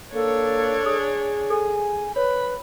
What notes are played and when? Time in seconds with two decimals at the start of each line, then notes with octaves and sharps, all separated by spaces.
0.14 A#3 D4 A4 C#5
0.86 G#4 D#6
1.50 A4 G#5
2.16 B4 C#5 B5